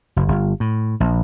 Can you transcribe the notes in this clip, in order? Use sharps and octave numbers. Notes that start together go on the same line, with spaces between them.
F#1
G1
A2
A#1